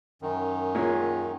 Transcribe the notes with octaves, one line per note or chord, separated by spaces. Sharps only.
F#2 D#3
A#2 G#3 C#4